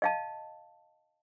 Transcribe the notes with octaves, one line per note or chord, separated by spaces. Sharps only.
D#5 F5 A5